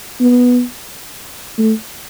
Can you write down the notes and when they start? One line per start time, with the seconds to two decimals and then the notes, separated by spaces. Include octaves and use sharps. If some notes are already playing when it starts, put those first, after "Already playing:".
0.21 B3
1.58 A3